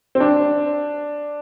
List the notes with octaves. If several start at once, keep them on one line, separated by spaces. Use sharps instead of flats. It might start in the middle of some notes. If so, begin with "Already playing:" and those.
C4
D4